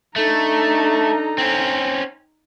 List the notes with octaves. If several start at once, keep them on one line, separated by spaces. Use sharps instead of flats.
A3 D4 D#4 A4 A#5
C4 C#4